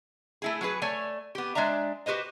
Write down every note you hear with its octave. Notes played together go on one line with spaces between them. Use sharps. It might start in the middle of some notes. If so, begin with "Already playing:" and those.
A3 E4 G#4
F#3 F#4 G#4 B4
A3 C#5 D5 G#5
B3 G4
G#3 D4 D5 E5 A#5
F#4 G4 B4 C5 D#5